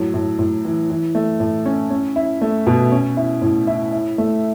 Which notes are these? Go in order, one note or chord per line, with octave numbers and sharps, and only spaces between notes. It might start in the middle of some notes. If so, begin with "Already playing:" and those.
Already playing: A2 F#3
A2
A2
E3
E3
A3
A2
C#4
C#4
E4
A3
B2
C#4
E4
A2
E4
E4
A3